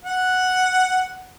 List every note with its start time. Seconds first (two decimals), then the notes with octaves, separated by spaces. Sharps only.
0.04 F#5